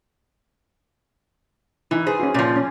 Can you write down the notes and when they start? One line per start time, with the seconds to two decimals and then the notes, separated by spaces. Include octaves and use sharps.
1.91 E3 D#4 E4
2.07 G#4 B4 C5
2.20 C#4 F#4
2.34 A#2 F3 C#4
2.56 C#4